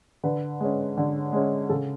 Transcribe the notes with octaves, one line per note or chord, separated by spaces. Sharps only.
D3 B4
G#3 C#4
D3
G#3 C#4
C#3 A4